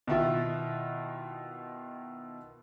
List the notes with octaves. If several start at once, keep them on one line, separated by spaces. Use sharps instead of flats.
B2 D#3 E4 F4